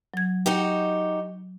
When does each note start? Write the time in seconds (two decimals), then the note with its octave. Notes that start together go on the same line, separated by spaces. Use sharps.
0.14 F#3 G#6
0.46 D#4 F#4 G4